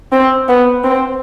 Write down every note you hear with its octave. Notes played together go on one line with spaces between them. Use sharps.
C4
B3
C4